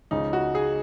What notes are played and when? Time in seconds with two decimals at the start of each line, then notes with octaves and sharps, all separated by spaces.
0.11 C#2 C#3 F3 D#4
0.33 F#4
0.55 G#4